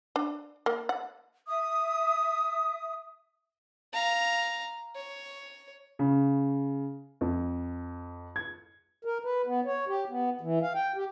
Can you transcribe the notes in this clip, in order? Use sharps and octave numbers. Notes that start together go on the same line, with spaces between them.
D4
A#3
F#5
E5 D#6
F5 A#5
C#5
C#3
F2
G#6
A#4
B4
B3
C#5
G4
B3
E3
F5
G5
G4